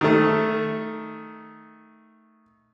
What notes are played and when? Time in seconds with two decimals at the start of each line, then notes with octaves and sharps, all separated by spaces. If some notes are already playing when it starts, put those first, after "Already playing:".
0.01 D#3 A3